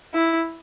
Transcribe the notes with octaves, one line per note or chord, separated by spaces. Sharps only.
E4